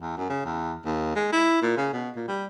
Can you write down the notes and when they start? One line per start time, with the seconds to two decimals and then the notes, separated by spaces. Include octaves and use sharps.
0.01 E2
0.17 F#2
0.29 C#3
0.45 E2
0.85 D#2
1.15 G#3
1.32 E4
1.62 A#2
1.77 C#3
1.93 B2
2.16 A#2
2.28 G3